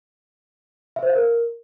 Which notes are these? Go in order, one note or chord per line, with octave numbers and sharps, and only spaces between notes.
E5
C5
F5
A#4